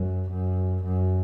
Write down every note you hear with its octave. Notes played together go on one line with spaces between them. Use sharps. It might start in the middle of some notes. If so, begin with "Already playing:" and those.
Already playing: F#2
F#2
F#2